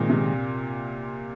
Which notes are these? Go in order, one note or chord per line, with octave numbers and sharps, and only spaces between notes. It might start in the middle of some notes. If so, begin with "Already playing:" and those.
Already playing: A#2 D#3 G#3 C4
C3